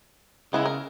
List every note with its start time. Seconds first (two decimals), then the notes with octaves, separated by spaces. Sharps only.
0.53 C#3 G#3 B3 E4
0.65 A#4